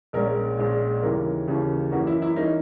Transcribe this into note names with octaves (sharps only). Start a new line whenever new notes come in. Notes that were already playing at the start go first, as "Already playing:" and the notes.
A#1 A#2 G#3 C#4 A#4
A#1 A#2 G#3 C#4
D#2 C#3 E3 A#3 C#4 A#4
D#2 C#3 E3 A#3 C#4
F#2 E3 A#3 C#4 F#4
E4
E4
E3 A#3 C#4 D#4